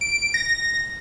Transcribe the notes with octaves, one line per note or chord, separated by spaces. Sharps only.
D7
A#6